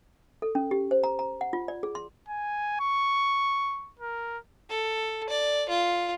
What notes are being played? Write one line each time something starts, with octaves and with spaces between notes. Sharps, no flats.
A4
C#4
G4
C5
A#5
A#5
F#5
F4
D5
G#4
C6
G#5
C#6
A#4
A4
D5
F4